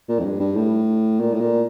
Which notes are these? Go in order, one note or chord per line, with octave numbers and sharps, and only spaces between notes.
A#2
F2
G2
G2
A2
A#2
A2
A#2